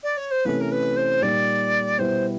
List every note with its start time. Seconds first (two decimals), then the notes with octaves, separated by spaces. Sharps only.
0.03 D5
0.17 C#5
0.31 C5
0.45 C3 E3 A3 C#4 B4
0.60 A#4
0.71 B4
0.96 C5
1.21 A#2 G3 A#3 D#4 D5
1.98 B2 G3 B3 E4 C5